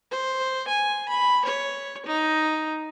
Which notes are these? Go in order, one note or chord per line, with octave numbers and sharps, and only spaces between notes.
C5
G#5
B5
C#5
D#4